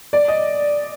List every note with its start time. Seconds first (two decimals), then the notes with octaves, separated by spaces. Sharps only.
0.13 D5
0.28 D#5